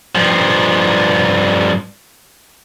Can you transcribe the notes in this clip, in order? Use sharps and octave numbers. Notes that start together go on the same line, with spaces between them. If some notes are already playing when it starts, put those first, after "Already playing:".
G2 F3